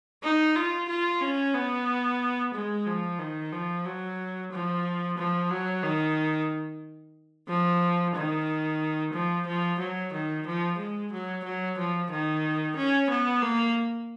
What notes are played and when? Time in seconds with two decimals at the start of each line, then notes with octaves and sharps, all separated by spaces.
0.23 D#4
0.56 F4
0.89 F4
1.21 C#4
1.54 B3
2.54 G#3
2.86 F3
3.19 D#3
3.52 F3
3.85 F#3
4.52 F3
5.18 F3
5.50 F#3
5.83 D#3
7.48 F3
8.15 D#3
9.13 F3
9.47 F3
9.79 F#3
10.13 D#3
10.46 F3
10.78 G#3
11.12 F#3
11.44 F#3
11.78 F3
12.11 D#3
12.76 C#4
13.10 B3
13.42 A#3